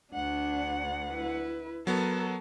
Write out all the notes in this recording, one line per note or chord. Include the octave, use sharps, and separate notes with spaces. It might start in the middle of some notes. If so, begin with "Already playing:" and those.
D2 D4 F#5
E4 B4
F#3 B3 A4 A#4